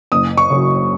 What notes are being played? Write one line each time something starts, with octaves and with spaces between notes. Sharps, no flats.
F#1 D#6
C#6
F#2 C#3